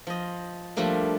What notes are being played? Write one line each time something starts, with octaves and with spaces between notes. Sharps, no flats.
F3 D#5
F3 G3 A3 A#3 D4